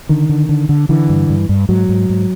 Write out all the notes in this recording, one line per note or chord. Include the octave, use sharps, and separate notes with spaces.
D3 D#3
D3
D3
D3
D3 E3
G2
G2
G2
G#2 F#3
G#2
G#2